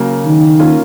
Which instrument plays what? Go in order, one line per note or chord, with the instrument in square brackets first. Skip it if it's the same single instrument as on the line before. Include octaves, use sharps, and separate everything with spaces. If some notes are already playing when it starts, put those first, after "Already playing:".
Already playing: [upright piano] C#3 F#3 A#3
[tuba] D#3
[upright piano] A#3 C#4 F4